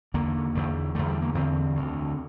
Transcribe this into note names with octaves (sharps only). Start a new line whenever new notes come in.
E2 D3 A#3
E2 D3
E2 D3 A3
G3
A#3
E2 D3 C4
D2 D3